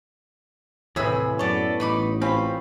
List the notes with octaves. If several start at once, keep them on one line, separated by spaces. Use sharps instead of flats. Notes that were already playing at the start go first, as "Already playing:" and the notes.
D#2 A2 C3 E3 G#4 B5 E6
F#2 B3 A4 C#5 D5
A1 D#4 B5 D6
C4 C#4 F4 E5 B5